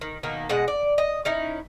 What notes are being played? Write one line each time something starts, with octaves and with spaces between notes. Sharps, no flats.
D#3
B2 D#3 A#3
B2 G#3 D#5 F#5
D5
D#5
C#4 D#4 E4